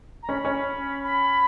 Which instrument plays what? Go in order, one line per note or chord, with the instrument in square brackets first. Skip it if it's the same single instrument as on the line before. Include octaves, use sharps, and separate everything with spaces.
[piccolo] A#5
[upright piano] C#4 [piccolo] B5
[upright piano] C#4
[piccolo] B5